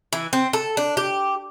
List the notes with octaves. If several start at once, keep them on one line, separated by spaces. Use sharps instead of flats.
E3
C4
A4
D4
G4